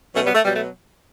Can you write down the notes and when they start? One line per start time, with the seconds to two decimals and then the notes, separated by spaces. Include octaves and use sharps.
0.14 B2 F#3 A3 C#4
0.24 G3 B3
0.35 A3
0.45 B2 F#3 G3
0.54 A3